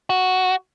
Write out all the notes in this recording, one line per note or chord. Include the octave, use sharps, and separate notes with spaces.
F#4